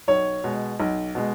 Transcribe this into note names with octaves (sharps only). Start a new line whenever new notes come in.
B1 C#5
B2 G#3
B1
B2 G#3